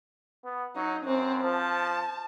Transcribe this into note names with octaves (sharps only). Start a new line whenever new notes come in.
B3
F#3 D#4
F#2 C4
F3 A5